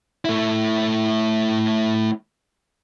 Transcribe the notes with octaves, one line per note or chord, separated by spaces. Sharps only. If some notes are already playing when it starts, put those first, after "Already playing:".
A3 E4